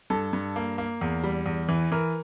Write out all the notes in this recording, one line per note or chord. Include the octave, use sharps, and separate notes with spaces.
G2 A4
G2
A#3
A#3
E2
G3
E2
E3
E3 A#4